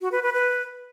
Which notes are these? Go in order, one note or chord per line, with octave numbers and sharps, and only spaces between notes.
F#4
B4
B4
B4